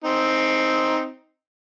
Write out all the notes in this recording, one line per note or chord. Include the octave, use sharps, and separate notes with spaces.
C4 D#4